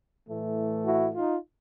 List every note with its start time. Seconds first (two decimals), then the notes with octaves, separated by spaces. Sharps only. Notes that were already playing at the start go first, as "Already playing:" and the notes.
0.27 A2 E3 A3
0.85 E4 F#4
1.15 D#4 F4